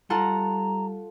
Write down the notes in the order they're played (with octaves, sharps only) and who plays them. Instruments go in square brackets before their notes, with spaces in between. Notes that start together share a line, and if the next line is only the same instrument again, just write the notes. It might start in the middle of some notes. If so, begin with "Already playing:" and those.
[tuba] G3 [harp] F4 A4 F#5 [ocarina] A#5